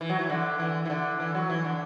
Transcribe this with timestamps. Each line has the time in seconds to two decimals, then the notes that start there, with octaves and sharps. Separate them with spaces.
0.01 E3
0.09 F#3
0.19 E3
0.30 D3
0.59 E3
0.85 E3
0.90 D3
1.20 E3
1.35 F#3
1.50 E3
1.65 D3